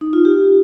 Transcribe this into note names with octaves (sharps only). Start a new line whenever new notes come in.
D#4
F4
G4